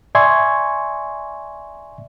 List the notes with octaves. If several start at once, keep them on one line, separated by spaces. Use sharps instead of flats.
D5 E5 G#5 C6 C#6 G#6